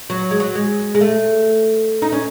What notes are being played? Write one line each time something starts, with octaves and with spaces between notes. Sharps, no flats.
F#3
G#3
F#3
G#3
G#3
A3
D#4
C#4